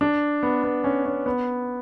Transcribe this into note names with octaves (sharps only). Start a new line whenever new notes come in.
D4
B3
B3
C#4
C#4
B3